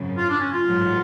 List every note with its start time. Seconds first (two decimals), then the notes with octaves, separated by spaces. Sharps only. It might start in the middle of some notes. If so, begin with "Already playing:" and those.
Already playing: G#1 F#2 C#3
0.18 F4
0.30 D4
0.41 C#4
0.53 F4
0.64 A1 G#2 F#3